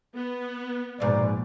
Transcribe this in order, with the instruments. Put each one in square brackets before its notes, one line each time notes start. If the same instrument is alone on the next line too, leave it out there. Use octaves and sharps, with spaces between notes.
[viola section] B3
[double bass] A#1 [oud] G#2 B2 [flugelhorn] D5